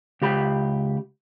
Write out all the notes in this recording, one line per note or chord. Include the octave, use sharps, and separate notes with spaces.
C#2 G4 B5